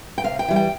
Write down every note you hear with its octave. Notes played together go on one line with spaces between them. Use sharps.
G5
C3 F5
G5
E3 G3
G5